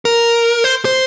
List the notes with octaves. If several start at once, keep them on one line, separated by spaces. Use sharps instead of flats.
A#4
C5
C5